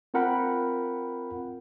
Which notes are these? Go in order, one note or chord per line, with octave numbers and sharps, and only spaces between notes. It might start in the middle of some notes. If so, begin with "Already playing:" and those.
C4 F4 A#4 F#5 G5 B5